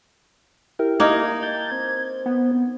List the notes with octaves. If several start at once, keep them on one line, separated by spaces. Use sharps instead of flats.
E4 G4 A#4
A#3 D#4 G#6
G5 A5 G6
C4
B3